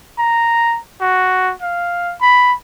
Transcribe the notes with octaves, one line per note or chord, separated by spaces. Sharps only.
A#5
F#4
F5
B5